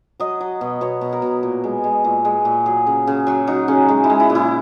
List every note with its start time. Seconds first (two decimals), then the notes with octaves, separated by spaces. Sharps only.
0.20 F#3 D#5
0.41 F#3
0.61 B2
0.81 B2 C#5
1.01 B2
1.13 A#4
1.22 B2
1.43 A#2
1.64 G#3
1.84 G#3
2.04 A#2
2.25 G#3
2.45 A#2
2.66 F#3 G#4
2.87 C#3
3.07 C#3
3.27 F#3 F#4
3.47 F#3 D#4
3.68 C#3 C#4
3.89 G#3
4.04 E4
4.10 G#3
4.20 E4
4.30 A#2
4.35 E4